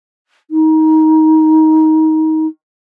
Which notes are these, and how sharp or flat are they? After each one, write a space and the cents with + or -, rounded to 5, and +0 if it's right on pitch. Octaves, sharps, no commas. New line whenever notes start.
D#4 +20